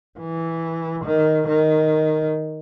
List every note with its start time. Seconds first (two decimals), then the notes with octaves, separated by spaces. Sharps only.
0.19 E3
1.04 D#3
1.48 D#3